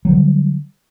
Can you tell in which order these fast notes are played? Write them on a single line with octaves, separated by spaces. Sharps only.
F#3 D3 G3